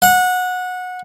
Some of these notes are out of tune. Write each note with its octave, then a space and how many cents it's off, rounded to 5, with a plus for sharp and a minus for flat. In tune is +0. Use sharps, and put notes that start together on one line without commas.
F#5 -20